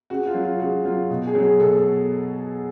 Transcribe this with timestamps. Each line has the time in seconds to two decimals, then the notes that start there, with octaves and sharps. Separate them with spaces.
0.10 C#3 F#4
0.27 F4
0.35 F#3
0.44 F4
0.60 C#3 F#4
0.85 F#3 F4
1.10 B2
1.27 G#4
1.35 F#3
1.43 G#4
1.60 B2 A4
1.77 A4